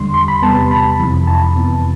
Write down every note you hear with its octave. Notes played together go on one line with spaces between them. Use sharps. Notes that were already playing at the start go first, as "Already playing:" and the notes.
Already playing: E2 D3 G3 C6
C6
B5
E2 C3 G3 B3 A5
B5
F2 C3 E3
A5
F2 C3 E3 B3